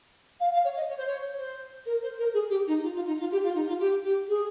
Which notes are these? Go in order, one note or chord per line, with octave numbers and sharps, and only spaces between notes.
F5
F5
C#5
D#5
C#5
C5
C#5
C5
A#4
C5
A#4
G#4
G4
D#4
F4
F4
D#4
F4
G4
F4
D#4
F4
G4
G4
G#4